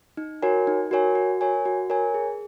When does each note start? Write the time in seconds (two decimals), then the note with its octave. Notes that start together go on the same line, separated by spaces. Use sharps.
0.17 D#4
0.42 F#4 A#4 C#5 G#5
0.67 D#4
0.91 F#4 A#4 C#5 G#5
1.15 F#4
1.41 A#4 C#5 G#5
1.65 F#4
1.90 A#4 C#5 G#5
2.14 G#4